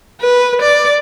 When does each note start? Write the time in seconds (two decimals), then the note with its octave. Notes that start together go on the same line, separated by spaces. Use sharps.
0.21 B4
0.61 D5